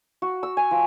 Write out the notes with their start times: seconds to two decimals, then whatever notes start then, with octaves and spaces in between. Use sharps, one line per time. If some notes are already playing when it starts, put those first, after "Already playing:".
0.22 F#4
0.43 E6
0.57 G#5
0.71 F3